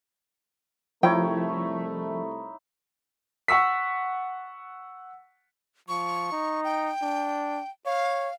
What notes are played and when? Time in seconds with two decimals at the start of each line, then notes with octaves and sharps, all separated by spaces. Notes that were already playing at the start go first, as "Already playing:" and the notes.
1.03 C2 F3 A3 D#4 E4 C#5 G5
3.48 F#5 C#6 E6 B6
5.88 F3 C#6
6.32 D#4
6.64 G5
7.02 D4
7.86 C#5 F5